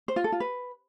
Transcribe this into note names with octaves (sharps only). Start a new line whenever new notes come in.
C5
F4
A4
F4
B4